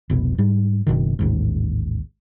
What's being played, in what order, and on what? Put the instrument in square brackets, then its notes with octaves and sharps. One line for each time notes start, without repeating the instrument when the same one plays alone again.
[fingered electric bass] F1 C2 B2
G#2 G3
F#1 C2 B2 D#3
A1 D#2 G#2